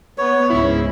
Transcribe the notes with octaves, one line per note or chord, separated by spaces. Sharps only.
B3 C#5
C#2 G#2 C#3 E4